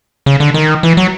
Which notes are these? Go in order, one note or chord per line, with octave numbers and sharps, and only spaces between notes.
C#3
D3
D#3
E3
F#3